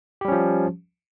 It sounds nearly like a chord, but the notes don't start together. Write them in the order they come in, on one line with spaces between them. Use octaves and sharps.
G4 G3 C#4 F3